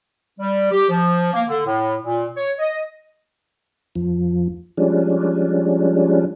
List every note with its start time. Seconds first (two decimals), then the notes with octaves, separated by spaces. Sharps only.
0.39 G3
0.71 G4
0.90 F3
1.34 A#3
1.48 D3
1.66 A2
2.02 A#2
2.37 C#5
2.59 D#5
3.95 F2 F3
4.77 F3 G3 G#3 C#4 D4